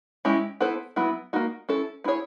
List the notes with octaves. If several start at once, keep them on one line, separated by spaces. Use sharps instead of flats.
G#3 C#4 E4 G4
B3 E4 A4 C5
F#3 B3 E4
A#3 D#4 F#4
C#4 E4 A4
B3 E4 G#4 C#5